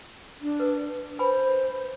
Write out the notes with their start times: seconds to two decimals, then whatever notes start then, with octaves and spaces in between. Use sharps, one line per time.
0.41 D4
0.60 A#4 B4
1.19 B4 C5 G#5 B5